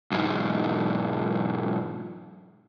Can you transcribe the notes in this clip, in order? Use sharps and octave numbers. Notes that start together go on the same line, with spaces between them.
B1 G#2